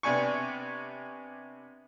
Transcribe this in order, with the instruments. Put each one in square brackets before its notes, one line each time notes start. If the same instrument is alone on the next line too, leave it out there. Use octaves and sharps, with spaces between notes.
[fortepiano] C3 B3 D4 G#5 C#6